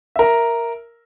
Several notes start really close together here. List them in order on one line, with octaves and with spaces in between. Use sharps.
E5 A#4 A#5